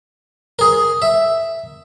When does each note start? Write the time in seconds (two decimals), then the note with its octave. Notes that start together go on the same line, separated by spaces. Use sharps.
0.59 G#4 A#4
1.02 E5